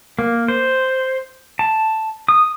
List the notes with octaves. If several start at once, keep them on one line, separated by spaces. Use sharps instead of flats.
A#3
C5
A5
D#6